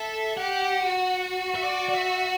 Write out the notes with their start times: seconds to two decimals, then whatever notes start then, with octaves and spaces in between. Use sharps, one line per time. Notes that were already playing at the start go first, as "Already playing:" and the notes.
Already playing: A4 E5
0.38 G4 F#5
0.85 F#4
1.55 E5
1.63 D5
1.89 D5
1.94 E5